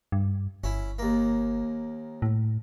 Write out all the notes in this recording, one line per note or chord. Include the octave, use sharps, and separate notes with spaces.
G2
G1 C#4 E4
D#2 A#3
A2